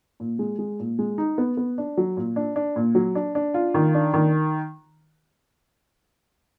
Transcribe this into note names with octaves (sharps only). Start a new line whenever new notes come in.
A#2
G#3
G#3
A#2
G#3
D#4
B3
B3
D4
F#3
A#2
D4
D4
A#2
F#3
D4
D4
F4
D#3
D4
D#3